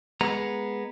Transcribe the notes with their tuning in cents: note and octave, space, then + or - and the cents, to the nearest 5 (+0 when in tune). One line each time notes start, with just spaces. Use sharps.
G#3 +0 B3 -5 A#5 +0